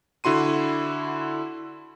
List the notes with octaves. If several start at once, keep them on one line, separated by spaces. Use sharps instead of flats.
D3 E4 F#4 C6 D#7